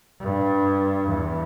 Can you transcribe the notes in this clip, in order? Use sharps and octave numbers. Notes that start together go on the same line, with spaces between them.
G2
E2